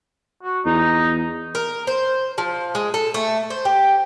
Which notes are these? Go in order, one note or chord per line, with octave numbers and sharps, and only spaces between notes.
F#4
E2 D#4
A#4
C5
F3
G#3
A4
A3
C5
G4